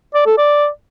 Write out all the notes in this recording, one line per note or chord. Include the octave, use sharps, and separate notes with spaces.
D5
A4
D5